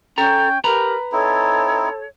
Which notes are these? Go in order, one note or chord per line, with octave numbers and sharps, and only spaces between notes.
C#4 A4 G5 A#5 G6
G4 A#4 B4 A#5 B5
C4 D#4 E4 A4 C#5